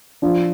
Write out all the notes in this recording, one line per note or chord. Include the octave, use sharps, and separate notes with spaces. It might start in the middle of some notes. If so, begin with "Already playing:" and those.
F3 D4